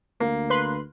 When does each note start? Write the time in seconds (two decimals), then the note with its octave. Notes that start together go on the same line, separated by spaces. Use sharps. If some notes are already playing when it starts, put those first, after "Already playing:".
0.20 D2 A#3
0.50 B4 C6 F#6